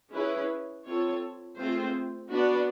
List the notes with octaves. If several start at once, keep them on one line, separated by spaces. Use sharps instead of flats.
C#4 E4 G#4 B4
C4 F4 A4 C#5
A3 C4 F4 G#4 C5
B3 D4 F#4 B4 D5